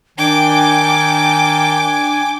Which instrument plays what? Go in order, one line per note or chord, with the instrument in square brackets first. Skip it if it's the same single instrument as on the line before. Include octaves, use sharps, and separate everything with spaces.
[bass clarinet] D#3 [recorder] D4 [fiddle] G5 D6 [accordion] G#5